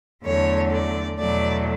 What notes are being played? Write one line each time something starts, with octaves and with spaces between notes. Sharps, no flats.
E2 D3 F#3 A3 C#5
D5
E2 B2 F#3 A3 D5